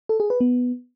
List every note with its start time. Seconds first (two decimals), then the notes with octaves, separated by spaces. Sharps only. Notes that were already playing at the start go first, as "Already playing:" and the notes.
0.09 A4
0.20 G#4
0.30 B4
0.41 B3